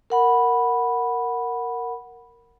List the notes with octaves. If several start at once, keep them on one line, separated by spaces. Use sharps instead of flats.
A#4 F#5 B5